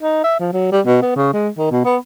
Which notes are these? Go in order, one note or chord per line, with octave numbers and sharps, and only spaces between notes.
D#4
E5
F3
F#3
G3
B2
B3
C#3
G#3
D#3
B2
B3